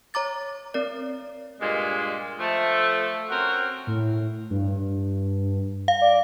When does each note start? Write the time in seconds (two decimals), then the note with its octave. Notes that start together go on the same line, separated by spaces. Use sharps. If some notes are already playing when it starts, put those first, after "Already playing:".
0.14 C#5 A#5 D6 A6
0.74 C4 A#4 D5
1.61 G2 A#2 G#3
2.38 F3 A3
3.30 C4 C#4 F#4 A#4
3.87 A2
4.50 G2
5.88 F5
6.01 D5